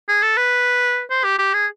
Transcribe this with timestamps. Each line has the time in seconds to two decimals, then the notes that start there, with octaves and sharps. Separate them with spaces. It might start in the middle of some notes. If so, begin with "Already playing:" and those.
0.09 G#4
0.22 A4
0.37 B4
1.10 C5
1.24 G4
1.39 G4
1.54 G#4